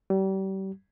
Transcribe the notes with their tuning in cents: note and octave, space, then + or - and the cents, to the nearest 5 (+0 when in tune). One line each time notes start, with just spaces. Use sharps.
G3 -35